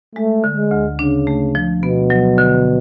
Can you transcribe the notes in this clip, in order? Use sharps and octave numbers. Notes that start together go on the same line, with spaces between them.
G#3 A3
D3
G#3
D2
C#3 D4
A3
F3
B2 B3
F#3
D3